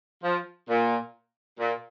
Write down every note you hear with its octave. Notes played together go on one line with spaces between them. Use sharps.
F3
A#2
A#2